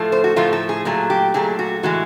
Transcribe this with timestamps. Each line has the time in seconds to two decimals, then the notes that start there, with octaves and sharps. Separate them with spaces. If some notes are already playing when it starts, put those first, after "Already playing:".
Already playing: A2 F3 A3
0.12 C5
0.24 F#4
0.36 A2 F3 A3 F4
0.53 A4
0.69 G#4
0.85 A#2 F#3 A3 G#4
1.10 G4
1.34 A#2 F#3 A3 G#4
1.59 F#4
1.83 A2 E3 G#3 F#4